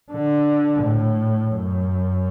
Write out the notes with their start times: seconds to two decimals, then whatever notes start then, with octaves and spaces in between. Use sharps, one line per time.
0.12 D3
0.83 A2
1.55 F#2